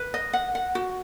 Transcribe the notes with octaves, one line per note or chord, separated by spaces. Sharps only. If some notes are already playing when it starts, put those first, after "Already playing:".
Already playing: B4
D#5
F#5
F#5
F#4